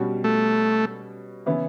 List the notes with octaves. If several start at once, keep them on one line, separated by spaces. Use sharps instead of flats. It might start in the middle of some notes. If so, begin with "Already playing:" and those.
Already playing: B2 G3 C#4 F#4
A3
C#3 E3 B3 E4